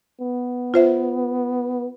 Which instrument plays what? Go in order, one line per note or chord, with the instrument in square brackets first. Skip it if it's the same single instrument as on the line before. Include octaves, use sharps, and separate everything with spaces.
[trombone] B3
[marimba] F4 C5 E5